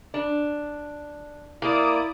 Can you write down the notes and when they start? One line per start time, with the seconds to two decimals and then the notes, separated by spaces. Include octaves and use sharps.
0.14 D4
1.62 A#3 E4 D5 D#6 D7